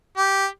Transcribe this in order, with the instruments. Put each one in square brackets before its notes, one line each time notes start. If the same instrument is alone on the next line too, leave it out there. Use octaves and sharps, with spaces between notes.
[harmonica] G4